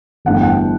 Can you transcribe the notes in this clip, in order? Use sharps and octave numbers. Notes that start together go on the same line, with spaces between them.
G1 G2 E3 A3 F#5
G5
F#5
G5